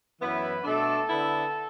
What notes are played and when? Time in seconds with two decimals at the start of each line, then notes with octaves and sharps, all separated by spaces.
0.20 F#2 E3 B3 E4 B4
0.64 B2 A3 D4 A4
1.09 D3 B3 E4